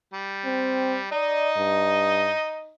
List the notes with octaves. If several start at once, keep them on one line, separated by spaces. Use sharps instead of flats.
G3
C4
D#4 D5 D#5
G2